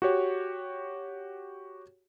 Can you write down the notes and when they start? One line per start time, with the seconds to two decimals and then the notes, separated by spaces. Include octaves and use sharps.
0.02 F#4 G4 C#5